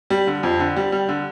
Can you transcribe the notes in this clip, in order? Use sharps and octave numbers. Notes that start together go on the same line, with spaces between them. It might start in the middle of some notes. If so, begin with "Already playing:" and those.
G3
D3
F2
D3
G3
G3
D3